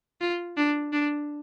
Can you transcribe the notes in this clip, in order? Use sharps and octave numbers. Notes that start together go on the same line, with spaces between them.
F4
D4
D4